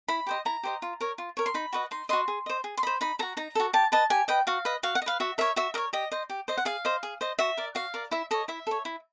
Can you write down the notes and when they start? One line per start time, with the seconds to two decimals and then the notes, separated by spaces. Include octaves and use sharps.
0.08 E4 B5
0.26 G4 C5 D#5
0.45 E4 A#5
0.63 G4 C5 D#5
0.82 F4
1.01 A#4 C#5
1.18 F4
1.37 A#4 C#5
1.46 C6
1.54 D#4 B5
1.73 F#4 B4 D#5
1.91 D#4 C6
2.09 F#4 B4 D#5 C6
2.28 G#4
2.46 C5 D#5
2.64 G#4
2.77 C6
2.83 C5 D#5 B5
3.01 D#4 B5
3.19 F#4 A4 A#5
3.37 D#4 A#5
3.55 F#4 A4
3.73 G4 A5
3.92 B4 D#5 A5
4.10 G4 G#5
4.28 B4 D#5 G5
4.47 F#4 F5
4.65 B4 D#5
4.83 F#4 F5
4.95 F#5
5.02 D#5
5.06 B4 F5
5.20 F#4 E5
5.38 A#4 C#5 E5
5.56 F#4 E5
5.74 A#4 D#5
5.78 C#5
5.93 G4 D#5
6.12 C5 D#5
6.30 G4
6.48 C5 D#5
6.58 F#5
6.65 G#4 F5
6.85 C5 D#5
7.03 G#4
7.21 C5 D#5
7.39 F#4 E5
7.57 A#4 D5
7.75 F#4 F5
7.94 A#4 D5
8.11 E4 E5
8.31 A4 C#5 D#5
8.48 E4 E5
8.67 A4 C#5
8.85 E4